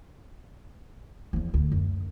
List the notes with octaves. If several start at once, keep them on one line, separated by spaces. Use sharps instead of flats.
E2 F3
D2
F#2